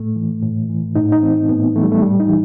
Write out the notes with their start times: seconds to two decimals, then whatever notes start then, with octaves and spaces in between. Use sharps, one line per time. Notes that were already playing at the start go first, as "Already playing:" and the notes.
Already playing: A2 A3
0.16 E3
0.43 A2
0.70 E3
0.96 A2 D#4
1.12 D#4
1.23 E3 C4
1.49 A2 B3
1.76 E3 A3
1.83 G3
1.92 A3
2.02 A2 G3
2.20 D#4
2.29 E3